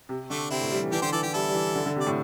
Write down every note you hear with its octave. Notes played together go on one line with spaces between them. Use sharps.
C3
D3 A3 D4
C3 C4 E4
A2
G3
E3
E3 D4 G4
D3 G4 C5
E3 A4 D5
E3 G4
G3 E4 A4
G3
E3
D3
D3
C3
D5
A2